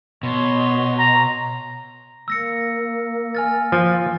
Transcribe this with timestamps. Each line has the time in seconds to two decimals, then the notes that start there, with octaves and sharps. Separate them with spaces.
0.23 B2 C#5 C6
0.99 A#5
2.28 A#3 E6 A#6 C#7
3.35 G#5 F6 A6
3.72 F3 A6